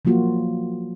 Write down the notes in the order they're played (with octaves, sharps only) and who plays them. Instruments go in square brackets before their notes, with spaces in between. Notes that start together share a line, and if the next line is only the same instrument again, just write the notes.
[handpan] F3 F#3 A#3 F4 F#4